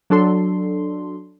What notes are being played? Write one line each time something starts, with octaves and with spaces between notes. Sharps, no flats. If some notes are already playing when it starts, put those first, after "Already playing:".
F#3 D4 A4 C6